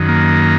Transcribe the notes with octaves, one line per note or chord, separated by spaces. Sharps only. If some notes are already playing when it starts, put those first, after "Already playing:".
Already playing: F#2 D#3
A#3